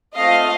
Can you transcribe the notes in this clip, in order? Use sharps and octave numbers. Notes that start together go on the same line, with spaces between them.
A3 C4 F4 D#5 F5